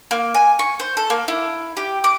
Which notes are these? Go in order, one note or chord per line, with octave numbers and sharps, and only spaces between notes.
A#3
G#5
C#6
C5
A4
A#3
E4
G4
D6